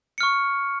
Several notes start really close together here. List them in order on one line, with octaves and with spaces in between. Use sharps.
C#7 F6 C#6